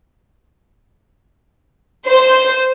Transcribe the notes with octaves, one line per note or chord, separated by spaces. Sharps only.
C5